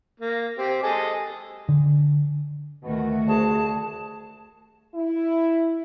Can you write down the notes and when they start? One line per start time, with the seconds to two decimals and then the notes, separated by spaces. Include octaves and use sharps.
0.20 A#3
0.59 C4 G4
0.83 G#4 A4 D#5
1.69 D3
2.83 D2 B2 D#3 A3 F#4
3.27 C2 G#4 A5
4.94 E4